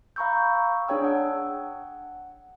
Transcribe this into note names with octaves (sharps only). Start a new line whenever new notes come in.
F5 A#5 B5 C#6 E6 G6
D4 G#4 C#5 G5 E6
F#5